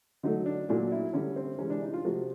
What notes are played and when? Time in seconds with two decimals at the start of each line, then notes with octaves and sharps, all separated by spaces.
0.23 D3 F#3 A3 D#4
0.46 D4
0.69 A#2 F#3 A3 D4
0.92 E4
1.13 D3 G3 C#4
1.36 C4
1.59 C3 E3 G#3 C#4
1.70 D4
1.82 D#4
1.94 F4
2.04 C3 F3 A3 F#4